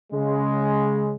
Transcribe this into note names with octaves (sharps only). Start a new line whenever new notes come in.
C#3 G#3